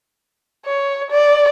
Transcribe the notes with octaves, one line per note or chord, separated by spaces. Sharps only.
C#5
D5